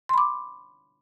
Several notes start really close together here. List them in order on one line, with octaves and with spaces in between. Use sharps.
C6 B5 D6